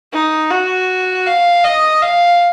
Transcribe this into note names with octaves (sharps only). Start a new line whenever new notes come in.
D#4
F#4
F5
D#5
F5